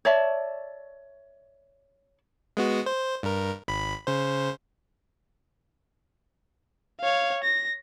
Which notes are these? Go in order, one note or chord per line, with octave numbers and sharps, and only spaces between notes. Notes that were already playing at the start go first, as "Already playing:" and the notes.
C#5 D5 E5 A5
G#3 B3 F#4
C5
G2 A#4
G#1 B5
C#3 C5
C#5 F5
A#6